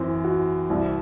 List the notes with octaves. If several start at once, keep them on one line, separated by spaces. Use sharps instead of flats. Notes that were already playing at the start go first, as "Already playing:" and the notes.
Already playing: F#2 E3 C4
F#4
C2